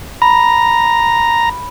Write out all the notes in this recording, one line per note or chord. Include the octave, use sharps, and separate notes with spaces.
A#5 B5